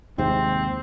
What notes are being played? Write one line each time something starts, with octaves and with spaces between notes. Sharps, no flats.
D#2 G#2 C3 C4